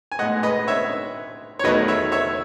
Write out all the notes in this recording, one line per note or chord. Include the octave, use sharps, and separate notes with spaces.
G#5
B1 A2 G#3 D#5 F#5
B4 D#5
C#5 E5
C#5
E2 D#3 F#3 A3 B4 D#5
C#5 E5
C#5 E5